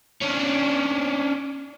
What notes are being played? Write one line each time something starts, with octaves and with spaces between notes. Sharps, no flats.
C#4 D4